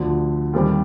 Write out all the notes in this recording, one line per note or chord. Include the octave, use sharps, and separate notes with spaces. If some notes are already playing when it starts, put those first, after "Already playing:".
Already playing: D2 D3 F3
D#2 D#3 G3 C4 G4